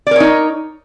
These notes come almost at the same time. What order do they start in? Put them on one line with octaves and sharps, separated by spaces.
D5 A#4 C#5 D#4